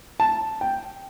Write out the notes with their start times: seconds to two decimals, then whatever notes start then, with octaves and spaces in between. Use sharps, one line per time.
0.20 A5
0.61 G5